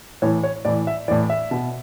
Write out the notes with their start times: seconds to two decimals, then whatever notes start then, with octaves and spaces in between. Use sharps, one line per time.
0.22 A2 E3 C#5
0.43 C#5
0.65 A2 E3 D5
0.87 E5
1.08 E3 D5
1.11 A2
1.30 E5
1.51 B2